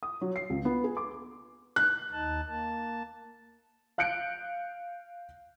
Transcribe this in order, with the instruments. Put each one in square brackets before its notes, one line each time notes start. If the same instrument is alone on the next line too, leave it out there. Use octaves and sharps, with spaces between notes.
[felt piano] D#6
F#3
C7
C#2
B3
G#4
D6
F#6
[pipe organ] D#2 D#4 A5
A#3 A5
[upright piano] F5 F#6 G6 C#7 D7